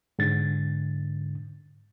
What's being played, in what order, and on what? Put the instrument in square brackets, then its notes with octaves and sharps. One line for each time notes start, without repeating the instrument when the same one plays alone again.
[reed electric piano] G#2 D3 A6